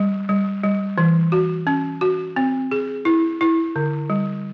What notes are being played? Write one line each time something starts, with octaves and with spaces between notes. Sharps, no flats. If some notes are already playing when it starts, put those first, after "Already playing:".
Already playing: G3
G3
G3
E3
F#4
C#4
F#4
C4
G#4
E4
E4
D3
G3